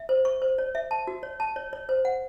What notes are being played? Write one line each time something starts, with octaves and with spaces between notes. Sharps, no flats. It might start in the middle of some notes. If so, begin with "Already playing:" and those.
Already playing: E5
C5
C#6
C5
C#5
E5
A5
F#4
C#5
A5
C#5
C#5
C5
F#5